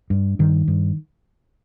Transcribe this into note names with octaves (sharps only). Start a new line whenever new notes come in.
G2
G2 D#3
G2